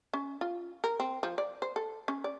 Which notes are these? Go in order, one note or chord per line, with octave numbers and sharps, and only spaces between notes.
C#4
F4
A#4
C4
F3
D5
C5
A4
C#4
D5